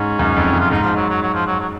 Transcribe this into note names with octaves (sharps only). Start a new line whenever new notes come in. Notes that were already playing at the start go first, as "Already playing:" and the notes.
Already playing: G#2 C#4
F#2
F2
F#2
F4
G#2 D#4
F3
F#3
F#3
F#3
F3
F#3
F#3